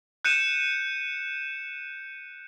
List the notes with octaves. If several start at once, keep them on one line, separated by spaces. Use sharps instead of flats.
F#6 G6 C#7 D#7 E7